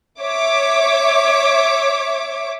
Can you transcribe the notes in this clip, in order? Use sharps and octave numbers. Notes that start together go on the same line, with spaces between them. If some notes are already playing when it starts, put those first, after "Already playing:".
C#5 E5 D6